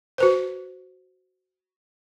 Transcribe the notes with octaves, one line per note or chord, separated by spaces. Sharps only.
F#4 B4 C5